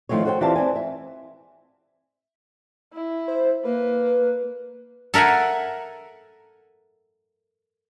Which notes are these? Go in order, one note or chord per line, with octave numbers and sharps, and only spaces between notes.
D#3 F3 A3 C4 C#5
F#4 A4 C5 C#5 F#5 G5
E3 C4 F4 G4 D5 A5
C4 D5 G#5
E5
E4
C5
A#3 B4
A4 A#4 E5 F#5 G#5